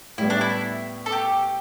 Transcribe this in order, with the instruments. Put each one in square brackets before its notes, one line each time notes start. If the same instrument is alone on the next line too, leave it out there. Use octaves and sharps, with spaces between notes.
[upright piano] A2 G3 B3 [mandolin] E4
[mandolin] D4
E4
A4
G4